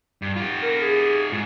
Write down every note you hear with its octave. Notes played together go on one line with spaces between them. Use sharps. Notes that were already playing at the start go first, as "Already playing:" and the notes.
G2
F4 G4
A#4
G#4
G#2